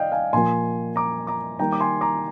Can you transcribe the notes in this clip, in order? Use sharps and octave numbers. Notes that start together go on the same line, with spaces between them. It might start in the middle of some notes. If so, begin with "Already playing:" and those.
Already playing: D#3 D5 D#5 F5 G5
F5 G#5
A#2 F3 A#3 G#5 C6
A#5 D6
A#5 D6
D#3 G3 A#3 G5 A#5
D6
G#5 C6
A#5 D6